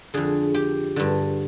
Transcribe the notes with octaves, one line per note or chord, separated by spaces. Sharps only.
F2 D3 G#4
G4
G2 D3